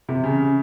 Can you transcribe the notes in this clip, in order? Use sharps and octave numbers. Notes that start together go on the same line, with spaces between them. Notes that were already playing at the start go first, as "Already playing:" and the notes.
C3
C#3